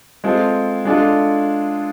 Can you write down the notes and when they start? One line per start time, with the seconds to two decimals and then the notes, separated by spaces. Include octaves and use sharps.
0.24 G#3 C4 F4 A4
0.85 G#3 D4 F4 A4